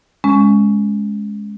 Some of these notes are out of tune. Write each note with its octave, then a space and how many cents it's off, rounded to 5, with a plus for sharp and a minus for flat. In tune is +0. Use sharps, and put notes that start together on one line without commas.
G#3 +0 C#4 +0